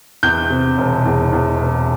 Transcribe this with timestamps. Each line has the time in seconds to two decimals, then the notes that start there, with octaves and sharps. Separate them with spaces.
0.23 E2 G6
0.50 C3
0.78 E1
1.05 E2
1.33 E2
1.60 E1